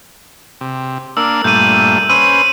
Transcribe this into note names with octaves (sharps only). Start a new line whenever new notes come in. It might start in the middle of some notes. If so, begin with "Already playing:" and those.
C3
A#3 D4 E6
G2 A#2 A3 G6 D#7
C#4 B4 C5 E6 D#7